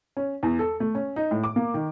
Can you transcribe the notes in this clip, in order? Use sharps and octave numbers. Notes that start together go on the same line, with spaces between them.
C#4
E2
A4
A3
C#4
D#4
A2
D6
A#3
D#3